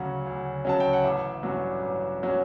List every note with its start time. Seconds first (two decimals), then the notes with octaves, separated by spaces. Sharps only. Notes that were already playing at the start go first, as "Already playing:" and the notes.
Already playing: D2 C#3 F#3 C#4 F#5
0.26 D2
0.65 C#3 F#3 C#4 A5
0.80 G5
0.93 F#5
1.04 A1 E5
1.43 G2 F#3 C#4
1.83 A1
2.23 F#3 C#4